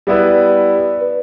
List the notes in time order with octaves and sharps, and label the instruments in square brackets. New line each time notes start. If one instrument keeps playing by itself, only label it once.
[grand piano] G3 B3 E4 B4 [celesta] D5
[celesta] B4